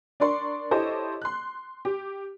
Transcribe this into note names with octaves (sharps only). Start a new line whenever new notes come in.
D4 A#4 D5 C6 C#6
E4 G4 A4 C5 C#5 D#5
C6 F#6
G4